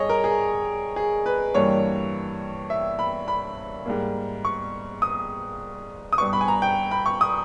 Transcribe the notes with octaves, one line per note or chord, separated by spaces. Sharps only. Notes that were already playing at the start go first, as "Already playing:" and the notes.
Already playing: G2 G3 G#4 C#5 D#5
A#4
G#4
G#4
B4
G2 E3 G3 A#3 C#5
E5
B5
B5
G#2 G3 A#3
C#6
D#6
D#6
G2 G3 B3 C#6
B5
G#5
A#5
G5
B5
C#6
D#6